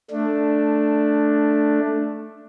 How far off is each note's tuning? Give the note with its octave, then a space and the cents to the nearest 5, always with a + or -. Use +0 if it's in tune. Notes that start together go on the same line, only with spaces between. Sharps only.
A3 +0 D4 +5